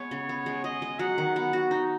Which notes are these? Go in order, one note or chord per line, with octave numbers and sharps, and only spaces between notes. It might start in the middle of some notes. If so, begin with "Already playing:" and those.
Already playing: G#3 B3 C#5
C#3
B3
G#3
G#4 D#5
G#3
F#3 F#5
D#3
B3
F#4
D#4